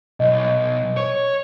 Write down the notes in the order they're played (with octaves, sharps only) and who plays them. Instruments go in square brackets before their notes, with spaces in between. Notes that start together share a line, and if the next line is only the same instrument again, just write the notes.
[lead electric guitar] B1 [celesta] D#5
[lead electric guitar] C#5